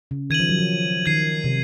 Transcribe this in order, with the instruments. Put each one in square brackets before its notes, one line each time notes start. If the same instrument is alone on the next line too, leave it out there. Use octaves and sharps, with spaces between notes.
[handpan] C#3
[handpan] D#3 [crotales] G#6 D#7 F#7
[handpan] F3
F#3
F3
[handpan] D#3 [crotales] G#6 C7 D#7 F#7
[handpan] C3